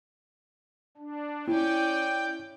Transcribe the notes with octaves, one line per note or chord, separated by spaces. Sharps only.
D4
C#4 E4 D5 G5